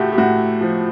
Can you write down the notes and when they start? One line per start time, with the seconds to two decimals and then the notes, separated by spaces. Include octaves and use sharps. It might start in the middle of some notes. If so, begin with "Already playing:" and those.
Already playing: A2 A3 F#4 G4
0.13 G4
0.18 A2 F#4
0.61 F3